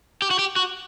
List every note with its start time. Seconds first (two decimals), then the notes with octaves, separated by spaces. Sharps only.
0.22 G4
0.31 F#4
0.39 G4
0.56 F#4